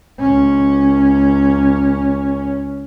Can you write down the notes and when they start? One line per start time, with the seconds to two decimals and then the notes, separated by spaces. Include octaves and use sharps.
0.19 C#2 C#4